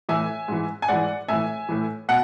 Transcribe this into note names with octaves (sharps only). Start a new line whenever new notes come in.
A2 E3 E5 G#5
G#2 E3
G#5
G#2 E3 D5 F#5
A2 E3 E5 G#5
A2 E3
B2 F#5